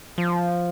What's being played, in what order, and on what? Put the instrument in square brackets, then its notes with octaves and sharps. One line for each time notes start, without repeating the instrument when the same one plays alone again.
[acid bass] F3